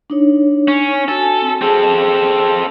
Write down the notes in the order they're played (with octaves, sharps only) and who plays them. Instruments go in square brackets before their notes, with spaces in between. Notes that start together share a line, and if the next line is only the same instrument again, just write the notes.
[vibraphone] D4 D#4 C#5
[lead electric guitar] C#4
[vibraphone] F#4 G#5 [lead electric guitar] A4
[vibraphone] C4
[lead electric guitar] C4 A4 [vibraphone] G#4 A5